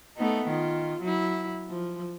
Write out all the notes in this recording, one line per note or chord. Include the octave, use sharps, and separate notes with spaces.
A3 B3 D#4
D#3 F4
F#3 E4
F3